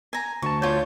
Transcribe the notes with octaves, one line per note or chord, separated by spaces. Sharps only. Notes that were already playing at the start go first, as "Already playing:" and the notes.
G#5 A#5
D2 A5 C#6
F4 C#5 D5 G6